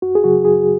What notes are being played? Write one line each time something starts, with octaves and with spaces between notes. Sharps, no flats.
F#2 F#4
G#4
C#3 F#3 F#4
F#2 G#4